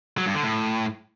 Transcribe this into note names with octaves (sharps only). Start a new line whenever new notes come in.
F#3
G2
D3
A2